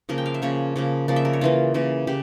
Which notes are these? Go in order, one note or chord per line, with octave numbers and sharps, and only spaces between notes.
C#3 F3 A#3 A#4
G5
F5
E5
C#3 F3 A#3 C#5
C#3 F3 A#3
C#3 F3 A#3 D5
E5
A#4
C#5
C#3 E3 A#3 F4
C#3 E3 A#3
C#3 G4